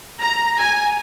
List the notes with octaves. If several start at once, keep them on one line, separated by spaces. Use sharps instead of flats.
A#5
G#5